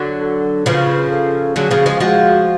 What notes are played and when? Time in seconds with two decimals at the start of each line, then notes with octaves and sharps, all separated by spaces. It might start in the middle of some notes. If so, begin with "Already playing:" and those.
Already playing: D3 F#3
0.21 A4
0.66 C#3 F3 B4
1.11 A4
1.56 D3 F#3 G#4
1.71 C#3 F3
1.86 F3 G#3
2.00 F3 G#3 F#4